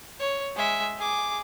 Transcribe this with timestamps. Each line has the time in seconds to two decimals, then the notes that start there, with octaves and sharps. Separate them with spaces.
0.19 C#5
0.56 G#3 E5
0.98 G#4 D6